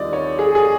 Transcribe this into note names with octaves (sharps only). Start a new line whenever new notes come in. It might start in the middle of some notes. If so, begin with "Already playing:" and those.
Already playing: D#2 D#3 G3 C4 F4 D5 D#5
C#5
G#4
G#4